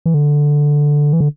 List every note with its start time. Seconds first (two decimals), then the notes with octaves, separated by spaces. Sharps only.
0.06 E3
0.14 D3
1.13 E3
1.20 D3